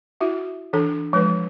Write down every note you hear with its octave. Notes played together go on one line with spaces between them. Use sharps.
E4 F#4 E5
E3 D4 A4
F3 G#3 B4 C#5